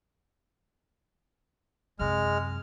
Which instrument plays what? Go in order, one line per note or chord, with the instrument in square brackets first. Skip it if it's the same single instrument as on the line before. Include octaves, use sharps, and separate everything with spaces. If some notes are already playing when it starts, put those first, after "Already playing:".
[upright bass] F#2 C3 [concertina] G#3 F6